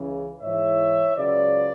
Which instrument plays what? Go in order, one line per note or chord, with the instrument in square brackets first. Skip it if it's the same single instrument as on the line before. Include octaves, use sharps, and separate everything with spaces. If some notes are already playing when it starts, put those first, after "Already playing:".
Already playing: [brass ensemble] C#2 C#3 E3
G#2 E3 C#5 E5
C#2 C#3 F#3 B4 D5